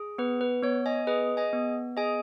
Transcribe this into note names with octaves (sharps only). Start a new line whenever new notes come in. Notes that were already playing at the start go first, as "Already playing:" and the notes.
Already playing: G#4
B3 B4
B4
B3 C#5
D#5 G#5
G#4 B4 D#5
D#5 G#5
B3
G#4 D#5 G#5